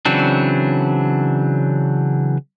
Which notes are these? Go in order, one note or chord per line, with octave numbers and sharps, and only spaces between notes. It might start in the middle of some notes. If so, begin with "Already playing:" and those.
C#3 E3 F#3 C4 D4